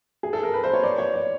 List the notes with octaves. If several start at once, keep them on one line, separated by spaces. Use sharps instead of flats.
G#4
A4
A#4
B4
C5
C#5
D5
C#5
D5